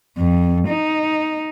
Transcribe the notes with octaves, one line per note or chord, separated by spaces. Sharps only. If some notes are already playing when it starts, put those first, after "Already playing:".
F2
D#4